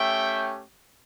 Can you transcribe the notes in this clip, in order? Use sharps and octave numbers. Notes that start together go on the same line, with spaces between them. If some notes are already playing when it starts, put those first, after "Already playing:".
Already playing: A3 C#4 G4 E5 G5